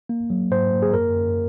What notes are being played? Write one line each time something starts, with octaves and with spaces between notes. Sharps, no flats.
A#3
F#3
G#2 C5
A#3
G#4
F#2 A#4
F#2